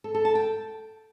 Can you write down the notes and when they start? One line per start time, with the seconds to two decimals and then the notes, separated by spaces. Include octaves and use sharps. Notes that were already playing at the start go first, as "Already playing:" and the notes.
0.04 A4
0.15 A4
0.25 A5
0.35 G5